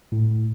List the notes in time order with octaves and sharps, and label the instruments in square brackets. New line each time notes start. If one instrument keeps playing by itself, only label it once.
[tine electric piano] A2